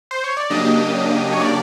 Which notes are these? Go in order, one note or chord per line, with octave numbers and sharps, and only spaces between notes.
C5
C#5
D5
C#3 F#3 A#3 D4 G4 D#5
C#5
D5